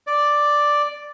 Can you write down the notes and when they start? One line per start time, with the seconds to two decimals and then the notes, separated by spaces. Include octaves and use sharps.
0.07 D5